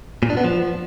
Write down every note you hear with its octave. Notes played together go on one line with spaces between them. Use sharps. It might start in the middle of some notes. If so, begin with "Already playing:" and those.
A#2
D4
B3
F3